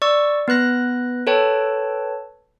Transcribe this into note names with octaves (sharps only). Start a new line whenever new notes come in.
D5 C#6 E6
B3 B4 F#6 A#6
A4 B4 C#5 G5 A5